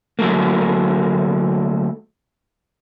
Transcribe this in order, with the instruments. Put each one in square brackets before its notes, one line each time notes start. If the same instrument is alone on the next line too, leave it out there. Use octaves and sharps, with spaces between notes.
[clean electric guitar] D2 F#3 A3 A#3